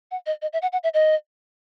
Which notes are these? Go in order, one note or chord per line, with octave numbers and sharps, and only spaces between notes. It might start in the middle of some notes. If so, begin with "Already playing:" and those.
F#5
D#5
D#5
E5
F#5
F#5
E5
D#5